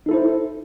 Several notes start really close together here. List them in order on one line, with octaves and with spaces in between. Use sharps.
D#4 A4 E4 C5